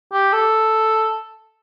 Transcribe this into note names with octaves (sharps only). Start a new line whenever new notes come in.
G4
A4